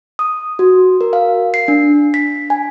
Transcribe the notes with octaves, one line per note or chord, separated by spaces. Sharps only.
D#6
F#4
A#4
F5
C7
D4
B6
G#5